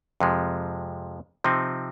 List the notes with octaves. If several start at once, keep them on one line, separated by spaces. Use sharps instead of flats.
F2 C3 F3 G#3
C3 F3 C4 D#4